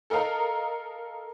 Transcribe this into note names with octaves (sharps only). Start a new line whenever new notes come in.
A4 A#4 D#5 F5 A#5